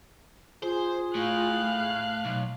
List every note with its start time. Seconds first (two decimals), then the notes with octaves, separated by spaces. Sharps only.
0.63 F4 G#4 C5
1.15 A2 F5 F#6
1.59 A3
2.25 B1